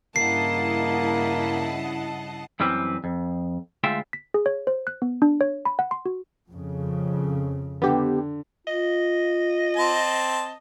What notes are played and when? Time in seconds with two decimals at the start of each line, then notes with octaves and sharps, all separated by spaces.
0.16 G2 C#3 A#3 E4 D#5 F#5 A5 C7
2.60 F#2 E3 G3 C4 B4
3.04 F2
3.84 D2 G#3 F4 E5 G5
4.13 B6
4.34 G#4
4.46 C#5
4.67 C5
4.87 F#6
5.02 B3
5.22 D4
5.41 C#5
5.65 B5
5.79 F#5
5.91 C6
6.06 F#4
6.50 F2 C#3
7.82 D3 B3 G4
8.67 F4 D#5
9.77 C4 A5